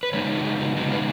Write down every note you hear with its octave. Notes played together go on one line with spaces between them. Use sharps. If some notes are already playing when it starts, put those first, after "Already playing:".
B4
C#3 G#3 B3 D#4 C#5
F#4
G#4
F#4
C#3 G#3 B3 D#4 F#4
B4